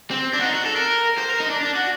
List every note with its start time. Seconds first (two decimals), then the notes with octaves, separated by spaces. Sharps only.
0.11 C4
0.33 D4
0.39 F#4
0.43 D#4
0.54 F#4
0.65 A4
0.76 A#4
1.18 C5
1.29 A#4
1.40 D#4
1.50 D4
1.61 D4
1.75 F#4